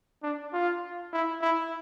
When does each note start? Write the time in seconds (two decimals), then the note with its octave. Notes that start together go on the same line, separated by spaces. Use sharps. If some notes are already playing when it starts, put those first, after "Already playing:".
0.23 D4
0.53 F4
1.13 E4
1.42 E4